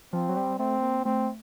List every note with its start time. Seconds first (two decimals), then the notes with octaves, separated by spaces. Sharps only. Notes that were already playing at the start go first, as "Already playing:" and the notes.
0.13 F3 C4
0.29 F#3
0.37 G3
0.59 A3 C4
0.82 A#3
1.05 A3 C4